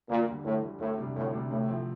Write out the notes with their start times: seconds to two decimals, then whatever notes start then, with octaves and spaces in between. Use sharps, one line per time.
0.09 D2 A#2
0.27 D3 G3
0.44 D2 A2
0.63 D3 G3
0.80 D2 A2
0.98 C3 G3 D4
1.16 D2 A2
1.33 C3 G3 D4
1.51 A2 C3
1.68 F3 A3 C4